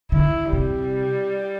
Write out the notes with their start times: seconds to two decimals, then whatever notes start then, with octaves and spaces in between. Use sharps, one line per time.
0.12 D3 E4
0.52 C3 G3